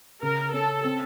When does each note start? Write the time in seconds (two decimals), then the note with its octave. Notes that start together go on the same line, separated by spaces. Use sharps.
0.23 C#3 A#4
0.54 C#4 A4
0.84 C4